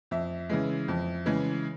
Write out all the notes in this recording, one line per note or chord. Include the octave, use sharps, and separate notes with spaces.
F2 E5
C#3 E3 G#3
F2
C#3 E3 G#3